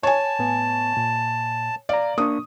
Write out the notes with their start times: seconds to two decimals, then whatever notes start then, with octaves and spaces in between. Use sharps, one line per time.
0.03 C#5 G#5 A5
0.39 A2 B3
0.97 A#2
1.89 D5 F5 A#5
2.18 A#3 D4 C#6 D#6